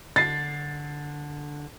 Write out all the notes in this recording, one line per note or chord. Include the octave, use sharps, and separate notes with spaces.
D3 A6 C7